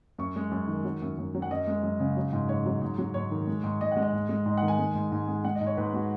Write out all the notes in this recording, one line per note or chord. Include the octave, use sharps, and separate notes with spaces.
F#2 C#6
G#3
F#2
D#3
F#3
F#2
F#2
F#3
F#5
F#2 D#5
G#3
F#2
C#3
F#3
G#2
G#2 C#5
F#3
G#2
F#3
G#2 C#5
D#3
G#3
G#2
G#2 D#5
F#5
G#3
D#5
G#2
G#3
G#2 D#5
F#5
D#3
G#5
G#3
G#2
G#2
G#3
G#3 F#5
D#5
G#2
C#5
G#2 B4
G#3 F#4